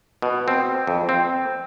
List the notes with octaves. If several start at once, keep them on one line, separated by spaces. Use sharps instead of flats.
B2
C4
F2
C4